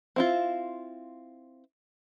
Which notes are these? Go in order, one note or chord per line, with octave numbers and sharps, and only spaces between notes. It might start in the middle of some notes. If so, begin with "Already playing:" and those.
C4 E4 F4